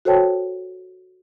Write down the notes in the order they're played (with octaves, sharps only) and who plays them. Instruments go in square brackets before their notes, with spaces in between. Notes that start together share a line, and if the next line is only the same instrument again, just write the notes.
[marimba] F#4 A4 C5 C#5 G5 A5